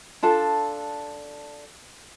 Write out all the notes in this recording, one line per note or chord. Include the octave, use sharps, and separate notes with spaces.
D4 F4 A4